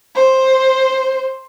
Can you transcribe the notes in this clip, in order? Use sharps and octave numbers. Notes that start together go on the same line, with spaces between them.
C5